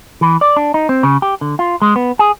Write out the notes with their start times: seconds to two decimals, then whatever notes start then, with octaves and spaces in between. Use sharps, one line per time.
0.21 E3
0.41 D5
0.56 D4
0.74 D#4
0.89 C4
1.03 C#3
1.22 G4
1.41 D3
1.59 F4
1.82 G#3
1.96 B3
2.19 G#4